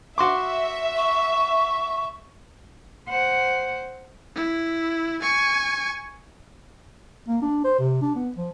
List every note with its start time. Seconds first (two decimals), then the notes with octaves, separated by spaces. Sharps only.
0.18 F#4 E5 C6 D6
0.97 C#6
3.09 C5 F#5
4.35 E4
5.22 G#5 C#6
7.28 A#3
7.42 D4
7.64 C5
7.79 C3
8.01 D4
8.15 B3
8.36 F3